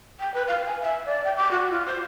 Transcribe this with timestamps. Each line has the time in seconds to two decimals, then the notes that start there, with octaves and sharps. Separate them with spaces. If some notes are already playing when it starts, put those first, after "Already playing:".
0.20 G5
0.34 B4
0.48 F5
0.66 G#5
0.81 E5
1.06 D5
1.25 G5
1.37 D6
1.51 F#4
1.70 F4
1.86 C5